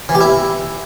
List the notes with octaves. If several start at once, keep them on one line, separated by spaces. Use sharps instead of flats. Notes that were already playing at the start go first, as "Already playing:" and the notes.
E3
G4
E4